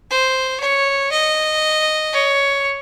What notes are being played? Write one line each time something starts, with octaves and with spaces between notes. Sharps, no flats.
C5
C#5
D#5
C#5